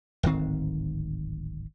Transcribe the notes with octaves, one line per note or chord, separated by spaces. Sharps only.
D1 G#1 D#3 C4